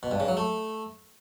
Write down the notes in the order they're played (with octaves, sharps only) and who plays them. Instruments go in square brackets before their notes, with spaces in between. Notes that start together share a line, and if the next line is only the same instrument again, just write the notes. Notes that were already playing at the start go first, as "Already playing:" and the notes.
[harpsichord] B2
G2
C#3
F#3
A3